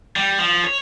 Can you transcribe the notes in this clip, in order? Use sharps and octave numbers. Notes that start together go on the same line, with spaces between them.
G3
F3
C#5